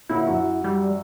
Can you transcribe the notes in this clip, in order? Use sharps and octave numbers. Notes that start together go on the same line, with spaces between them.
A#2 D3 E4 C#5
F#2 F#4
G3